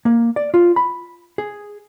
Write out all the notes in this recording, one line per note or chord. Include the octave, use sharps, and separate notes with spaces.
A#3
D5
F4
B5
G#4